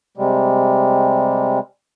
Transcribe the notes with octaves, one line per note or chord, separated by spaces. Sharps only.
C3 G3 G#3